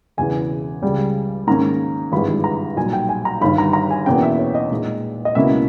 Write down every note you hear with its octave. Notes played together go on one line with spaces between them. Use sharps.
E1 E2 C#3 E3 G#5
C#2 C#3 G3
G#2 D#3 A#3 C#4 A#5
G#1 G2 E3 G#3 B5
A#5
B1 A#2 G3 G#5
G5
G#5
A#5
G1 G2 D#3 B5
A#5
A#5
G#5
E2 B2 A#3 C#4 G5
E5
C#5
D#5
A#2 G#3 D#4
D#5
C#2 B2 A#3 C#4 E4 E5